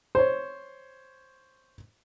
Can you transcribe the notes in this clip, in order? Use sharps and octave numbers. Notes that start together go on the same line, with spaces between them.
C5 C#5